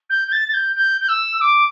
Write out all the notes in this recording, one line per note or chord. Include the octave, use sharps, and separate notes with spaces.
G6
G6
A6
A6
G6
G6
G6
E6
D6